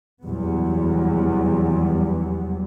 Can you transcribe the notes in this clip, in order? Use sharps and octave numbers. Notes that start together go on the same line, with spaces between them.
F1 E2 F#3 G3 B3